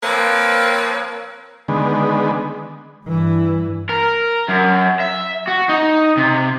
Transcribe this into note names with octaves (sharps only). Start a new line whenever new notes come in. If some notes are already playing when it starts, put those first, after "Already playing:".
F3 A#3 C4 B4 C#5 F5
D3 D#3 G#3 B3
G2 E3
A#4
F#2
E5
F#4
D#4
C3